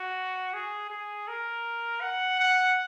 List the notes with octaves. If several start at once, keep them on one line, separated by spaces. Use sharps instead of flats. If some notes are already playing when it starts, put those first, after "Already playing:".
Already playing: F#4
G#4
G#4
A#4
F#5
F#5